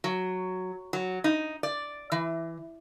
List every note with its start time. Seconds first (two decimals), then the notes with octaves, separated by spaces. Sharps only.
0.04 F#3
0.93 F#3
1.24 D#4
1.63 D5
2.12 E3